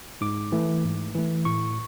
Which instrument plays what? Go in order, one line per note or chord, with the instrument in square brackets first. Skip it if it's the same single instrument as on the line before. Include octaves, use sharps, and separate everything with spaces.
[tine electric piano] G#2 D6
E3 A3
G#2
E3 A3
A2 C#6